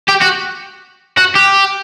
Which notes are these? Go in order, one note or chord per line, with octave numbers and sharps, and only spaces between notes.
G4
F#4
F#4
G4